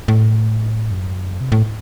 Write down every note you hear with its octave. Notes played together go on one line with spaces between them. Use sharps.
A2
F#2
C3
A2